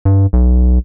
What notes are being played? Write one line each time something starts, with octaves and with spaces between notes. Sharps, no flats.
G2
B1